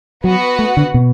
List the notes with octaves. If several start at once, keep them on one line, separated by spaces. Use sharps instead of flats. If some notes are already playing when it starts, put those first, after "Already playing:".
F#3 B3 F#4 B4 F#5
A3
D3
B2